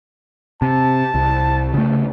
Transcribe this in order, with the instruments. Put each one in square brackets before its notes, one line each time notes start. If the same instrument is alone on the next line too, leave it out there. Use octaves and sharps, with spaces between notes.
[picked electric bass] C3 [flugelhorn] A5
[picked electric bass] C2
C#3 A3